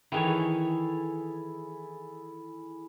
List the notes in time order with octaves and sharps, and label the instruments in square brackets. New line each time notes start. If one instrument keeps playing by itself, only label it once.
[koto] D#3 E3 C#5 [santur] E4 G#4 A4